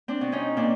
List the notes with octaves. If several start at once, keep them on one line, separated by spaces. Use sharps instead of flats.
C4 D4
B2
C#4 D#4
A#2 C4 D4